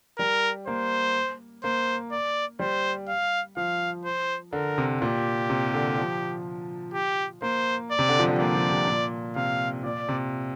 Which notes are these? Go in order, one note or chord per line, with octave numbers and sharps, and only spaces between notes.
G3 A#4
A#3 C5
A#3 C5
D5
G3 C5
F5
F3 F5
C5
D3 A#4
C3
A#2 G4
C3
D3
F3
G4
A#3 C5
D5
C3
D3
F3
G3
A#3 D5
F3
C3
A#2
C3 F5
A#2 D5
C3